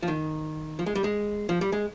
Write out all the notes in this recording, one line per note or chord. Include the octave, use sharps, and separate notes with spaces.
F3
D#3
F3
G#3
G3
G#3
F3
G3
G#3